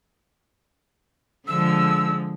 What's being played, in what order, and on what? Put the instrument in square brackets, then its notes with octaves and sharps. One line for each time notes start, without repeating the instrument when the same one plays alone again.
[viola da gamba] D3 F3 G#3 [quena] E6